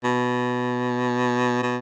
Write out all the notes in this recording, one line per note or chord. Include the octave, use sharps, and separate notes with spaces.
B2
B2